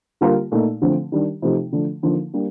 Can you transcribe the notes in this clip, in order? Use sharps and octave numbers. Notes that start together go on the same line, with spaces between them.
D3 G3 A#3 F4 A#4
A#2 A3 D#4
D3 F3 A3 C4
D#3 G3 D4
C3 F3 A3 C4 D#4
D3 F3 A3 D4
D3 F3 A#3 D#4
G3 A#3 D4 G4